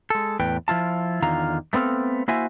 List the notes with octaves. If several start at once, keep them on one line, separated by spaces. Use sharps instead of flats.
G#3 A4
E2 A2 B4 G5
F3 E4 F4 A5
E2 D3 D#3 F4 F5 A#5
A3 B3 C4 A4 F5
A#3 E4 F#4 C5 E5 G#5